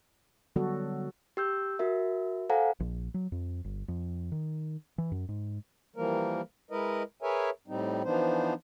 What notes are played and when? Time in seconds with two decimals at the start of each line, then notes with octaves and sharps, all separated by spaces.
0.56 D3 F#3 G3 B3 F#4 A4
1.37 G4 E6 G6
1.79 F#4 A#4 E5
2.49 A4 C5 F5 F#5 G#5 A#5
2.80 A#1
3.14 F#3
3.32 F2
3.64 G1
3.88 F2
4.32 D#3
4.98 E3
5.12 F#2
5.29 G#2
5.96 E3 F3 G3 A#3 A#4
6.71 G#3 E4 A#4 B4 D#5
7.22 G#4 A#4 B4 C#5 E5 G#5
7.68 A2 G3 C4 D#4
8.04 E3 F3 B3 D4 D#4 C5